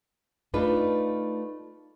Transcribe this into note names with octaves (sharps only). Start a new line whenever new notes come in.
A3 D4 D#4 F4 B4